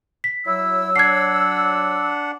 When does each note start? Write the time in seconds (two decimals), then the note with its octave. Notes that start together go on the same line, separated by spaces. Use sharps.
0.24 B6
0.46 F#3 E4 E6
0.96 D4 F#5 G#6 C7